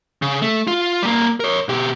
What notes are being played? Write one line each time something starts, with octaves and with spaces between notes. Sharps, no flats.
C#3
A3
F4
G3 A#3
A#4 C#5
B2 G4